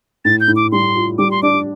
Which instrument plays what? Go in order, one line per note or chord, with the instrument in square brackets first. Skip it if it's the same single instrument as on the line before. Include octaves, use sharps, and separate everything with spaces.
[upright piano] A2 [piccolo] A6
[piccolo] G6
[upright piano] A2
[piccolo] D6
[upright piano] G3 [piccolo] C6
[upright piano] F4
[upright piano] G3 [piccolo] D6
[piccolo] C6
[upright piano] D4 [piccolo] D6